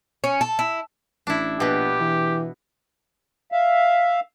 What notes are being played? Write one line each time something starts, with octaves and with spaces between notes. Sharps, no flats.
C#4
A4
E4
A1 D4 E4
A#1 B2 B3 G4
E3
E5 F5